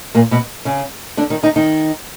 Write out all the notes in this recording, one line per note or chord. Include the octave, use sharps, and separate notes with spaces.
A#2 A#3
B2 B3
C#3 C#4
D3 D4
D#3 D#4
D#3 D#4
D#3 D#4